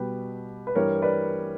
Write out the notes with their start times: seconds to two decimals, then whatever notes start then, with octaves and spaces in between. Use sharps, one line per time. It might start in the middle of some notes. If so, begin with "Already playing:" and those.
Already playing: B2 G3 G4 B4
0.67 B4
0.75 G2 E3 G3 A#4 C#5
1.02 B4 D5